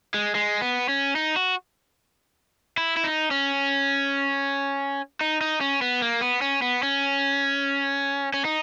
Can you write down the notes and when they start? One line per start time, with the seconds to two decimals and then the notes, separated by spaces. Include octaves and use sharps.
0.14 G#3
0.35 G#3
0.61 B3
0.89 C#4
1.16 D#4
1.36 F#4
2.78 E4
2.97 E4
3.04 D#4
3.31 C#4
5.21 D#4
5.41 D#4
5.61 C#4
5.82 B3
6.02 A#3
6.21 B3
6.42 C#4
6.62 B3
6.83 C#4
8.34 C#4
8.45 D#4